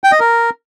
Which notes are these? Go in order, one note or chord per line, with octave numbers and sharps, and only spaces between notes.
G5
D#5
A#4